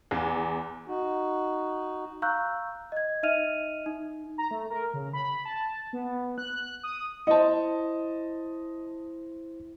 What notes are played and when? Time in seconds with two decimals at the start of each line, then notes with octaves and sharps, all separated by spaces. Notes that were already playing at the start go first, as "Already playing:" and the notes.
0.11 E2
0.88 D#4 F#4
2.22 F5 A#5 C#6 E6 F#6 G6
2.92 D#5 G#6
3.23 D#4 D#5 E5 F6 D#7 F7
3.86 D#4
4.38 A#5
4.51 A3
4.70 A#4
4.94 C#3
5.13 B5
5.45 A5
5.93 B3
6.38 F#6
6.83 D#6
7.27 E4 C5 D#5 A5